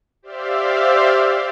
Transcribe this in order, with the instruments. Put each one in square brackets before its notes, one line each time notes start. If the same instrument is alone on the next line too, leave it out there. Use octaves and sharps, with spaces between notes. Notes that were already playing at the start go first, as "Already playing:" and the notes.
[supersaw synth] G4 C5 D5 E5 F5